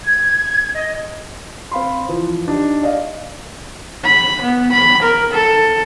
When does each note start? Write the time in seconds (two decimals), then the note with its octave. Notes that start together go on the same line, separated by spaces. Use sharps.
0.05 G#6
0.74 D#5
1.72 C4 F5 B5 C6
2.09 E3 F3
2.48 D4 D#4 G4
2.83 D5 D#5 F5
4.04 B5
4.42 B3
4.72 B5
5.02 A#4
5.32 A4